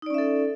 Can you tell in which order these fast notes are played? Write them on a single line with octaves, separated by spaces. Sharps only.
D#4 D5 C#4 E5 A4